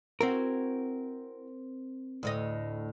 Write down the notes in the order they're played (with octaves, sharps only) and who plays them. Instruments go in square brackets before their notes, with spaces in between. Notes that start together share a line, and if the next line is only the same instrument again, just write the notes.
[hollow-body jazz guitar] C4 A#4 [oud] E4 F#4
[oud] D2 A2 D#5